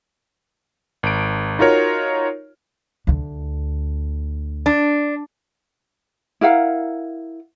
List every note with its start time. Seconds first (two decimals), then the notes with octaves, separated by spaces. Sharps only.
1.03 G#1 D7
1.59 D#4 F4 F#4 A#4 C#5
3.07 D2 D3
4.66 D4
6.41 E4 A#4 F5 F#5